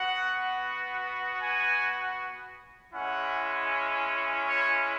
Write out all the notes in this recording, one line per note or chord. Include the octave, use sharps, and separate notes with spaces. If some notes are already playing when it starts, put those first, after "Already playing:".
Already playing: B3 F#4 F#5
G#5
G#3 C#4 E4 F#5
C#5